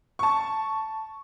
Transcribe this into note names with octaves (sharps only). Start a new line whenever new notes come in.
A5 C#6